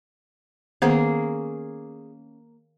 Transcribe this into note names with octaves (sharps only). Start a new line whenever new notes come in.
D#3 A#3 B3 C#4 G#4 C5